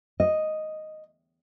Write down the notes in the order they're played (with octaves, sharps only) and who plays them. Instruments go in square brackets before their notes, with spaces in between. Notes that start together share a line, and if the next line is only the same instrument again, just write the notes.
[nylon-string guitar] D#5